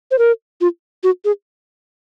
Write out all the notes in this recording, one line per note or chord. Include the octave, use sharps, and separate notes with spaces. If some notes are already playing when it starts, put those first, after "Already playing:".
C5
A#4
F4
F#4
G#4